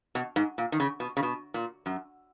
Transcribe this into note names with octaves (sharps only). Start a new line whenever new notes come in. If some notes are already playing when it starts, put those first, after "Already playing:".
B2
G#2
A#2
D#3
C#3
B2
C#3
B2
A#2
F#2